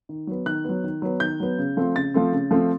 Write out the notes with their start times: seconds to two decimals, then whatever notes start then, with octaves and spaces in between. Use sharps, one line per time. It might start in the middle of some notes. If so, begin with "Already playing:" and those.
0.09 D#3
0.27 F#3 B3
0.46 D#3 F#6
0.64 F#3 B3
0.84 D#3
1.02 F#3 B3
1.20 D#3 G6
1.40 F#3 B3
1.58 C#3
1.77 F3 A3 C4
1.95 C#3 A6
2.14 F3 A3 C4
2.33 C#3
2.51 F3 A3 C4